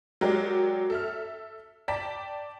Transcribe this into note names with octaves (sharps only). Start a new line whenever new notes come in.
F#3 G#3 G4 A#4 D5
A4 E5 F6
D5 G5 A5 B6